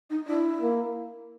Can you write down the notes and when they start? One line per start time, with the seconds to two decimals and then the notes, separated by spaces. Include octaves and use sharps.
0.10 D#4
0.27 D4 E4
0.61 A#3